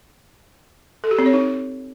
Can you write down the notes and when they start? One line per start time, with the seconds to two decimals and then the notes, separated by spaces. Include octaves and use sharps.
1.04 A4
1.11 G4
1.19 C4
1.26 C#5
1.33 D#4